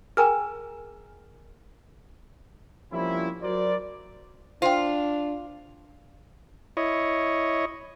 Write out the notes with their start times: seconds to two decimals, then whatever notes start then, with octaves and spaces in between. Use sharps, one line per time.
0.17 G#4 A#4 G5 G#5 A#5 F6
2.92 F3 G3 A#3 C4 C#4 E4
3.42 F#3 F#4 A#4 C5 D5
4.62 D4 F4 C5 G5
6.77 E4 C#5 D#5